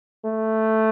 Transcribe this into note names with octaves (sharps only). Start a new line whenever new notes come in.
A3